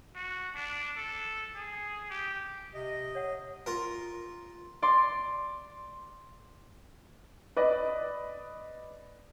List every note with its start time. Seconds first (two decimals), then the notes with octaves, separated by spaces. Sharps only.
0.15 F#4
0.55 D4
0.97 A4
1.55 G#4
2.10 G4
2.74 C3 D#5
3.15 C#5 F#5
3.66 F4 A#4
4.82 D5 C6
7.56 B4 D5 D#5